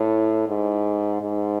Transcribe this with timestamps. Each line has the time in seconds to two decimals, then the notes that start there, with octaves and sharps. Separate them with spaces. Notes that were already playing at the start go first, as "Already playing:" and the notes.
Already playing: A2
0.48 G#2
1.22 G#2